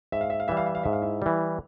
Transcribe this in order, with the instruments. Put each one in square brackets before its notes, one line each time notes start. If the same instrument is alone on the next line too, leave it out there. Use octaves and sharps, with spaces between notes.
[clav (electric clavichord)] G#2 [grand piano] E5
[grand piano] F5
E5
F5
[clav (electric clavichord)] E3 G3 [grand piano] E5
[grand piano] F5
E5
F5
[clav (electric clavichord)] G#2 [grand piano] E5
[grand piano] F5
E4 E5
[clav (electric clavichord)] E3 G3